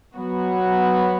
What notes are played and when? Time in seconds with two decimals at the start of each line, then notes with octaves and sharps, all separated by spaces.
0.15 F#3 B3 F#4